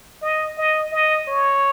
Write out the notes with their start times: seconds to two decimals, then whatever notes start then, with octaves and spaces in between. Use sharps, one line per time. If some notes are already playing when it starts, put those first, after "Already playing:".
0.22 D#5
0.58 D#5
0.92 D#5
1.28 C#5